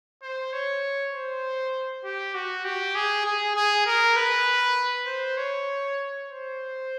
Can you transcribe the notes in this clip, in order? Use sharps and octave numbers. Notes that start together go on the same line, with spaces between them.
C5
C#5
C5
G4
F#4
G4
G#4
G#4
G#4
A#4
B4
C5
C#5
C5